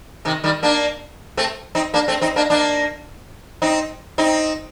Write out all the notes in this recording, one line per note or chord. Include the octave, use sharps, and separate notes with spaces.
C3 D#3
D#3 G3
A#3 D4
A3 C4
C4 D#4
A#3 D4
A3 C4
C4 D#4
A#3 D4
A#3 D4
C4 D#4
C4 D#4